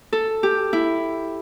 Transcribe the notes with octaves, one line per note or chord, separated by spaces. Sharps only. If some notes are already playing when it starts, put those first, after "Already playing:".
A4
G4
E4